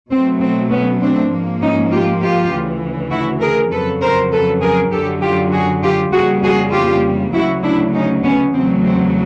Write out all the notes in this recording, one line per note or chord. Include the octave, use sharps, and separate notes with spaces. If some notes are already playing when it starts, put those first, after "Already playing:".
B2 F#3 A3 C4
C4
B3 C#4
C4 D4
G#2 F3 A#3
C#4 D#4
F4 G4
F4 G4
D2 C#3 E3
E4 F#4
G#4 A#4
F2 C#3 F#3 A4 B4
A#4 C5
A4 B4
G#4 A#4
F#2 D3 F#3 G4 A4
F4 G4
F#4 G#4
F4 G4
F2 C#3 E3 G3 A#3 F#4 G#4
F#4 G#4
F4 G4
D2 C#3 F#3 E4 F#4
D4 E4
C#4 D#4
B3 C#4
E2 C#3 F#3 A3 C4
C4